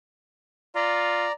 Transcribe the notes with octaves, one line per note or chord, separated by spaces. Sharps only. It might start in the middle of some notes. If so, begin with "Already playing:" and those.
F4 D5 A#5